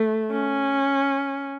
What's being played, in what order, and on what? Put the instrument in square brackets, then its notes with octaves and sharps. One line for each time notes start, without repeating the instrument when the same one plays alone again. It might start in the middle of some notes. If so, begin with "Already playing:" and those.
Already playing: [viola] A3
C#4